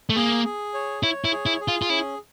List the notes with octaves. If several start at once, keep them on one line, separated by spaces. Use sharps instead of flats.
A3
A#3 G#4
G#4
C#5
E4 C#5
E4
G#4
E4
G#4
F4
F4
C#4 E4